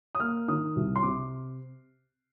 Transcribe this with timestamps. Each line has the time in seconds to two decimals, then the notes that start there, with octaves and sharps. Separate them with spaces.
0.15 D#6
0.20 A#3 F6
0.48 D#3 D#6
0.76 C2
0.96 C6
1.03 C3 D6